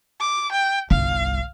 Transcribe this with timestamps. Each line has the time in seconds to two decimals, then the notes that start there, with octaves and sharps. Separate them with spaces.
0.20 D6
0.52 G5
0.91 G1 C2 F5